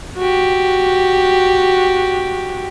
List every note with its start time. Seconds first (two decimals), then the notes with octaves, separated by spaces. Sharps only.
0.17 F#4 G4